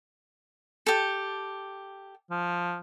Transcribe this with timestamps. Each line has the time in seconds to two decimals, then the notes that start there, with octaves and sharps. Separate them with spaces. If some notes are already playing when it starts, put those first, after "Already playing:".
0.86 G4 A4
2.30 F3